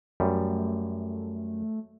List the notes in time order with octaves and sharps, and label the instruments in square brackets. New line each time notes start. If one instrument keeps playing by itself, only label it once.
[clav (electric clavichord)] F#2 G3 [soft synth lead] A3